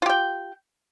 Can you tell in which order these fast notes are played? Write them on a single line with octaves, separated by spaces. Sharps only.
F4 G4 G5